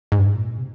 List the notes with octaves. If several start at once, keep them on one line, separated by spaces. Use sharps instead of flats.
G#2
G2
G#2
A#2
C3